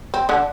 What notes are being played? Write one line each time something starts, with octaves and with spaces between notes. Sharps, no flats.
C4
D3 D4